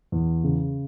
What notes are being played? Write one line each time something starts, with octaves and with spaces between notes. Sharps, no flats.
E2
C#3